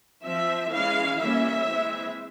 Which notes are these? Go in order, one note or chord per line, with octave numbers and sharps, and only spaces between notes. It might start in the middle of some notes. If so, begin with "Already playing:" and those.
F3 C4 E5
E3 G#3 C#4 F5
E3 G3 A#3 C#4 E5
E3 G#3 C4